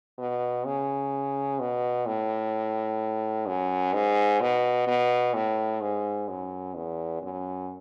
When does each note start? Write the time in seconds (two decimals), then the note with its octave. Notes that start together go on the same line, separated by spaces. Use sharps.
0.19 B2
0.66 C#3
1.59 B2
2.06 A2
3.47 F#2
3.94 G#2
4.41 B2
4.87 B2
5.34 A2
5.81 G#2
6.29 F#2
6.75 E2
7.22 F#2